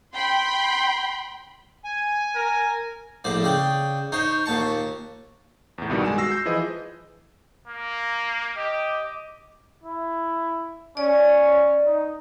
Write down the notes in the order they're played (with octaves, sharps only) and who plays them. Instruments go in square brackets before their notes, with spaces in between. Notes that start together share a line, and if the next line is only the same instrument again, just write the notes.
[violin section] G5 B5 C6
[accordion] G#5
[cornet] A#4
[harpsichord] A#1 A2 C5 D5
C#3 D5 G5
D#4 C5 C#5
D#2 A#2 A5 C#6
[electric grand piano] E2 A2
C2 G2 B2 D#3 G3
G#3 G#5 E7
F#4 E6 A#6 C7
G6
E3 F3 G#4 B4 D#5
[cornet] A#3
[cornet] G4 [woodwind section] D#5 D6
[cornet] E4
[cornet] C#4 [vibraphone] D5
[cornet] D#4